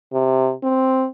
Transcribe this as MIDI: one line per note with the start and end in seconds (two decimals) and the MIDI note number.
0.13 0.53 48
0.63 1.07 60